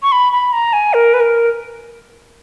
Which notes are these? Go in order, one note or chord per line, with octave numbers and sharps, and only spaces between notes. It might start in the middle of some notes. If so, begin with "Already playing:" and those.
C#6
B5
B5
A#5
G#5
A#4
B4
A#4